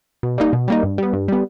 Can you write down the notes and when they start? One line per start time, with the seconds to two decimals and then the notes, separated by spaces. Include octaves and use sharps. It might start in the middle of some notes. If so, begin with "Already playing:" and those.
0.23 B2
0.38 G3 A#3 D#4
0.53 B2
0.68 G3 A#3 D#4
0.83 G2
0.98 G3 B3
1.13 G2
1.28 G3 B3